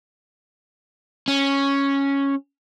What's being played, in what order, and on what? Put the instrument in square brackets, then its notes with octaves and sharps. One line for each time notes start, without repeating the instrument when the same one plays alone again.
[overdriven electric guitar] C#4